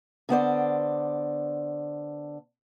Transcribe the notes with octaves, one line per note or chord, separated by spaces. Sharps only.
D3 B3 C5 D5